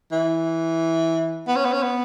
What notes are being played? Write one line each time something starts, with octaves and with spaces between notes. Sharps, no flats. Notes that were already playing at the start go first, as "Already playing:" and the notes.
E3
B3
C#4
B3
C#4
B3